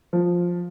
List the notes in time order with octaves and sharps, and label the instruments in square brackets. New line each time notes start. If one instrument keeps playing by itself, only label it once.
[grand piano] F3